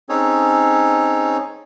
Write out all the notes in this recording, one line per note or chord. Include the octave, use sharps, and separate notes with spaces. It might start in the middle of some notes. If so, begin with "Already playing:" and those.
C4 C#4 D#4 G#4 A4 C#5